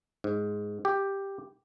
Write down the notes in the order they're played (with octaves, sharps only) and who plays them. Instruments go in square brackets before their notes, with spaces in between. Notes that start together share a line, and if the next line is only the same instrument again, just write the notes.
[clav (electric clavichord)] G#2
G4